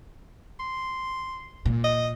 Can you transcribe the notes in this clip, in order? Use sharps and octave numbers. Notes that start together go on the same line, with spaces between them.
C6
A#2
D#5